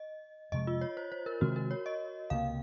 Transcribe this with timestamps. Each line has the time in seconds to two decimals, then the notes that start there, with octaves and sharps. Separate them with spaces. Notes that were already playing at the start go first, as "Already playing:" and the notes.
Already playing: D#5
0.52 F2 C3 F3 G#3 D#5
0.67 F4
0.81 C#5
0.97 C5
1.12 C5
1.26 A#4
1.41 C3 D#3 G#3 C4 F#4
1.56 A#4
1.71 C#5
1.86 D#5
2.30 C#2 C3 F#3 A#3 F5